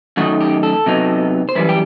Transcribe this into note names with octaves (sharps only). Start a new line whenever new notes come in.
F#2 D#3 A3 D#4 F#4
G4
A4
C3 F#3 B3 D#4
C5
F#2 E3 G3 B4
G4